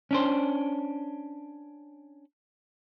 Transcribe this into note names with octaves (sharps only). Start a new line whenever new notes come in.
C#4 D4 C5